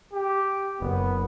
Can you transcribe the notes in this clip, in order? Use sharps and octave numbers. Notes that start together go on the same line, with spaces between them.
G4
F#1 B3